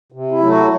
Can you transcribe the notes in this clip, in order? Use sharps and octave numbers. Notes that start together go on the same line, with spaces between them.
C3
E4
F#3 A3
F#4